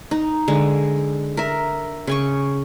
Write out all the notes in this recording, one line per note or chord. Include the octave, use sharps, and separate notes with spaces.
D#4
D3 G#3
A#4 E5
C#3 G#5 C#6